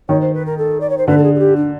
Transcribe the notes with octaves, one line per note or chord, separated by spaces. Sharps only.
D#3 C#5
C5
B4
A#4
A4
D5
C#5
C5
D3 B4
A4
G#4
G#4
G4
D4